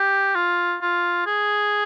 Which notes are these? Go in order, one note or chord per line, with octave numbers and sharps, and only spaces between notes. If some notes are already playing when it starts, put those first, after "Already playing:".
Already playing: G4
F4
F4
G#4